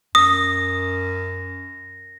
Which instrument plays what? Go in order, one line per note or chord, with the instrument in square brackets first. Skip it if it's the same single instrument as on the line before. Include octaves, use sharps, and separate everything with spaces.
[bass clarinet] F#2 [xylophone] D#6 [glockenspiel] A#6